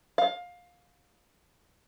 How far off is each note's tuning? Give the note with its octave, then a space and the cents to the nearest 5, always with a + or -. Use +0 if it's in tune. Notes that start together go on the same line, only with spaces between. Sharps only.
F5 +20